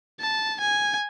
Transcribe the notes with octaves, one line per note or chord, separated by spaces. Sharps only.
A5
G#5